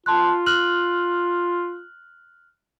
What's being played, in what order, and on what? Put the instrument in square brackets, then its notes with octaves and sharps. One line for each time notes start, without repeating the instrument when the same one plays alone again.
[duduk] F4 [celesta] A5 C6 F#6
[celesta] F6 F#6 F#7